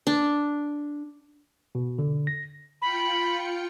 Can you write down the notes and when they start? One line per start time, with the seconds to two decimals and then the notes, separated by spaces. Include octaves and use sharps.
0.07 D4
1.75 B2
1.99 D3
2.27 A#6
2.82 F4 G5 B5 C#7